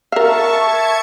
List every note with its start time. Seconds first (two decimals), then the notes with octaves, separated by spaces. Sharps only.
0.12 A#4 E5 F5 A5 C#6
0.60 G#6 C#7